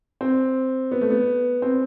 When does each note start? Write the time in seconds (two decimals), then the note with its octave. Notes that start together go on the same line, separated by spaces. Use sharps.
0.21 C4
0.91 B3
1.01 A3
1.10 B3
1.62 C4